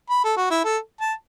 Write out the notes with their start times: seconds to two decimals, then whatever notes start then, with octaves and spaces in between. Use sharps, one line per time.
0.10 B5
0.24 A4
0.37 F#4
0.51 E4
0.64 A4
1.00 A5